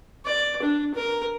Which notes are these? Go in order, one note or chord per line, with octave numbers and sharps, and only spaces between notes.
D5
D4
A#4